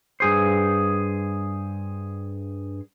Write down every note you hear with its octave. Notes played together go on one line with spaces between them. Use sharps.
G2 G#4 C5